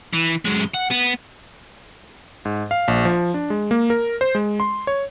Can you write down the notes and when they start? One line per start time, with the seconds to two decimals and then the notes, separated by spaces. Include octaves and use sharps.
0.13 E3
0.45 F#2 G#3
0.74 F#5
0.91 B3
2.45 G#2
2.71 F5
2.88 A#1
3.05 F3
3.34 D4
3.50 G#3
3.71 A#3
3.90 A#4
4.21 C5
4.35 G#3
4.60 C6
4.87 C#5